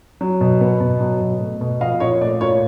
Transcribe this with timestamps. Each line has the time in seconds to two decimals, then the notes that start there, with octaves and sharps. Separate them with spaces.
0.21 F#3
0.41 B2
0.61 B3
0.80 B2
1.00 F#3
1.21 B2
1.40 A3
1.61 B2
1.81 F3 D#5 F5
2.00 A#2 C#5 D#5
2.21 A3 D5
2.41 A#2 C#5